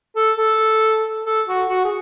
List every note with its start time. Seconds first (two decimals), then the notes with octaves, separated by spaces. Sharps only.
0.16 A4
0.38 A4
1.25 A4
1.48 F#4
1.69 F#4
1.84 G#4